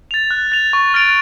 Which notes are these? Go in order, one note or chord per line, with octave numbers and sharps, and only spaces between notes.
A6 F7
F#6
A6 F7
C#6
F6 A6 D7 F7